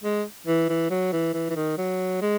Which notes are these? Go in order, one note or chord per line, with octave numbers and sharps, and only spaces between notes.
G#3
E3
E3
F#3
E3
E3
E3
D#3
F#3
G#3